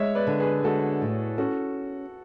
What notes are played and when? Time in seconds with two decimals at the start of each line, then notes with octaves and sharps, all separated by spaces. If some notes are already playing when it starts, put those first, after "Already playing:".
Already playing: G#3 C#5 E5
0.15 B4 D5
0.27 D3
0.40 G#4 B4
0.64 G#3 F#4 A4
1.01 A2
1.38 C#4 F#4 A4